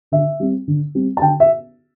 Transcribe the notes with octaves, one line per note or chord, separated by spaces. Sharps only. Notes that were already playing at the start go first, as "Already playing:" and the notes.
D3 E5
G3 C4
D3
G3 C4
A5
D3 G5
E5